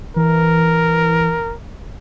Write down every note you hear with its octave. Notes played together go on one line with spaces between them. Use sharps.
E3 A#4